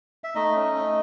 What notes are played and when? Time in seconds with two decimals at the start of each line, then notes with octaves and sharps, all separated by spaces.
0.24 E5
0.35 A3 D#4 D#5
0.55 C#4
0.75 A3